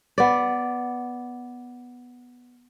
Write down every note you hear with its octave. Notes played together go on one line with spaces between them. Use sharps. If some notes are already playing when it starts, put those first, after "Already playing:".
B3 D5